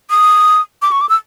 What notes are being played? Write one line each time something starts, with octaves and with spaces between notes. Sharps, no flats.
D#6
D6
C#6
D6
E6